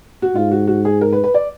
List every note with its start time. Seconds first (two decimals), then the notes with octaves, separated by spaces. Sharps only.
0.22 F#4
0.35 G#2 F4
0.51 F#4
0.67 F#4
0.85 G#4
1.01 A#4
1.13 B4
1.24 B4
1.34 D5